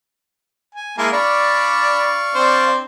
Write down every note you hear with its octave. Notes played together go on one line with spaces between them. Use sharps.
G#5
G#3 A#3 E4 F5 G#5 A5
D4 D5 F5 B5 C#6
C4 D4 C5